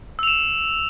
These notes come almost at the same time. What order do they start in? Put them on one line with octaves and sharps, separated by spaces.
E6 F7 E7